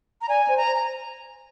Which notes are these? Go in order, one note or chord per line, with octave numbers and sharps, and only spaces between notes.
A#5
D5 G#5
C5
A#5
C5
A#5